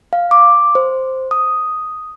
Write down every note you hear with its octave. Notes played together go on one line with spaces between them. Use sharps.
F5
D6
C5
D#6